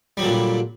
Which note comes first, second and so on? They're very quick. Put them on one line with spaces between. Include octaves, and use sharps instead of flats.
G3 F#3 D3 A#2